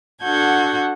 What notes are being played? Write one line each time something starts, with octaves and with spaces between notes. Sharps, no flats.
D4 F#4 A4 F#5 G6 G#6